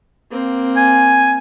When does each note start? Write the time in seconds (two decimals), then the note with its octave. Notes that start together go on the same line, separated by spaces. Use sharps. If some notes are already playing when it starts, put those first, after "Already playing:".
0.31 A#3 C4
0.76 G#5